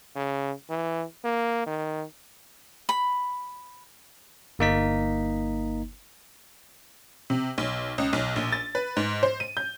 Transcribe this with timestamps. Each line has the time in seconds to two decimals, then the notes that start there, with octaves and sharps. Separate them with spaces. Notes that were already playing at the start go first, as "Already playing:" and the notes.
0.16 C#3
0.70 E3
1.24 A#3
1.66 D#3
2.89 B5
4.59 G1 A#3 D#4 B6
7.30 C3
7.58 B1
7.98 C#2
8.13 B1
8.36 A#1
8.52 A6
8.75 B4
8.97 G#2
9.23 C5
9.40 D#7
9.57 G6